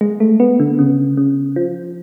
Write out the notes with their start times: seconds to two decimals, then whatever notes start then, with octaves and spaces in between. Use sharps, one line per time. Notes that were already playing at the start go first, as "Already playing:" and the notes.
0.01 G#3
0.20 A3
0.40 B3
0.60 D3
0.79 C#3
1.17 C#3
1.56 F3